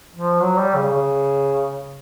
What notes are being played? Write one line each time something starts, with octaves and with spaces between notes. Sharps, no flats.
F3
F#3
G3
C#3
C#3